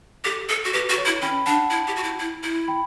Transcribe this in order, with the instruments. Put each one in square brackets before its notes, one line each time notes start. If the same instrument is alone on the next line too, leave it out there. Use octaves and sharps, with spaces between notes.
[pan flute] G4 [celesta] A4
[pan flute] A4
F#4
[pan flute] G4 [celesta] B4
[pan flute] F#4
[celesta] C#5
[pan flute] E4
[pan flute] C#4 [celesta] G5 B5
[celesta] B5
[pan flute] D4 [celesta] F#5 A5
[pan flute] E4
G4
F#4
E4
E4
E4
[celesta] G5 B5